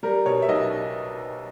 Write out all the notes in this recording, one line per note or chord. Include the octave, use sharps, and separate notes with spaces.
G3 A#4
B2 C#5
E5
B1 D#5